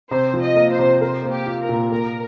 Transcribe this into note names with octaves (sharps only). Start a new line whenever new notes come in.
C3 C5
F3
D#5
A#3
C5
C3
A#4 C5
A#3
G4
F4
A#4
A#2
A#3 A#4